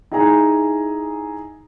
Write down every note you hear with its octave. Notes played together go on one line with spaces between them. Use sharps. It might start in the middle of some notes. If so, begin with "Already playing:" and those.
D#4 E4 G#4 G#5 A#5